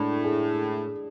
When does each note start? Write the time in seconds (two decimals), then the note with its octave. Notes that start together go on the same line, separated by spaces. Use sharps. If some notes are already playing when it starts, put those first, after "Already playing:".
Already playing: A2 G#3 D4
0.24 G#4